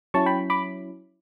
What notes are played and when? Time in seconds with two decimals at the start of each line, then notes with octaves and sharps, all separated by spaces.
0.14 F#3 C#4 E4 A5 C#6
0.26 G5 B5
0.50 B5 D6